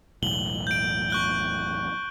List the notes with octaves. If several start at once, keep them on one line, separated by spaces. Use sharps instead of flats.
E1 B1 A2 F#7 G7
G6 D7
C#6 F#6 G7